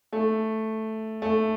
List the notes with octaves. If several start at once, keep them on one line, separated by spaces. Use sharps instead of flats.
A3
A3